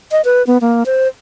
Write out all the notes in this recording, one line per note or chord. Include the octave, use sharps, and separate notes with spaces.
D#5
B4
B3
A#3
C5